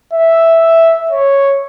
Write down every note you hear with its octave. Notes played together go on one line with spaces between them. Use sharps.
E5
C#5